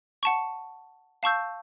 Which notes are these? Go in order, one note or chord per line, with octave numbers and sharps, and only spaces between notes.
F#5 A5 C#6
F5 A5 C#6 E6 G6